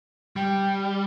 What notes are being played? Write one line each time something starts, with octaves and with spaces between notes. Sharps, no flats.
G3 G5